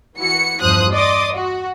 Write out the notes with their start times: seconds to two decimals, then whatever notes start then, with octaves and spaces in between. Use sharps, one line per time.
0.17 E3 F#4 C#7
0.61 E2 G2 F3 C5 D#6 F#6
0.92 D5 D#5 C6 D6 D#6
1.34 F#4